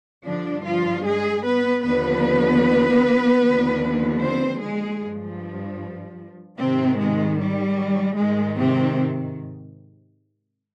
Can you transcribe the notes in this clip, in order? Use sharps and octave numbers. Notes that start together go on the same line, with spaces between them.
G2 D3 F3 D4
F3 F4
G#3 G#4
B3 B4
D#2 D3 F3 B3 B4
D#2 D3 F3
C4 C5
G#3 G#4
G2 F3
G#2 C3 D#3 C4
G#3
G3
G#2 D#3 G#3
C3 C4